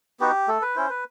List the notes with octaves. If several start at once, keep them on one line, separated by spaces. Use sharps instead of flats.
B3 D#4 F#4 G4
A3 A4
B4
C#4 E4 C5
B4